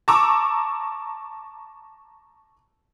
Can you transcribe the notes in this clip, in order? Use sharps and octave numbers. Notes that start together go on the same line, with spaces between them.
A5 A#5 C#6 D6 E6